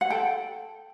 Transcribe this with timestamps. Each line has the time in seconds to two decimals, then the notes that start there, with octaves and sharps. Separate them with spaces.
0.01 F#5
0.10 A4 G5